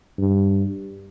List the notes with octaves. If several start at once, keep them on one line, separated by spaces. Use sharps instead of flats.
G2